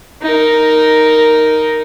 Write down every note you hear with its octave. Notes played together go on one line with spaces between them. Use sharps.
D#4 A#4